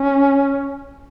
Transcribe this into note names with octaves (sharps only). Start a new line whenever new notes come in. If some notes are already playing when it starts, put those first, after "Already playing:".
Already playing: C#4